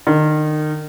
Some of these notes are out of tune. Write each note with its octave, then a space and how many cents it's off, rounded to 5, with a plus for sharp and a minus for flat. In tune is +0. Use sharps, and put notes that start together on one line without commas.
D#3 -30